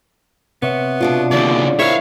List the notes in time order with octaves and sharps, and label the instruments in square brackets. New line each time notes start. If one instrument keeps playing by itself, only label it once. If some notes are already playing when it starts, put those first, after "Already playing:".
[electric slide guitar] C3 C#5 E5 [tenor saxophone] B3
[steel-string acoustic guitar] B2 D4 F4
[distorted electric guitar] D#2 C#3 [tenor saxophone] D5
[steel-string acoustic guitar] E4 [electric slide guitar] G#4 A#4 C5 [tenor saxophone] C#5 [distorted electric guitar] E5 F5